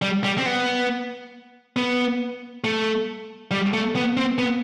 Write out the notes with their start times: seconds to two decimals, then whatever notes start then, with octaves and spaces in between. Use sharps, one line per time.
0.02 G3
0.24 G3
0.38 C4
0.46 B3
1.77 B3
2.64 A3
3.51 G3
3.73 A3
3.96 B3
4.17 C4
4.38 B3